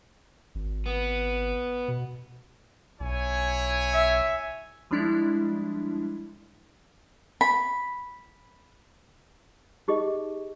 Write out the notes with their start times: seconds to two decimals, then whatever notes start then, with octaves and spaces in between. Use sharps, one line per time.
0.55 G#1
0.86 B3
1.88 B2
3.00 B1 E4 C#5 G#5
3.94 E5
4.91 F3 G3 G#3 D4 E4
7.41 B5
9.88 D#4 G4 G#4 D#5